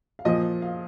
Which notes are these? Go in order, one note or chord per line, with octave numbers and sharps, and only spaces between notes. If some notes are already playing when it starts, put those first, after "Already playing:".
F5
A#2 F3 D#5
F5